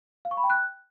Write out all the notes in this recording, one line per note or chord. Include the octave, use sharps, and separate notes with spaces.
F5
C#6
B5
G5
F#6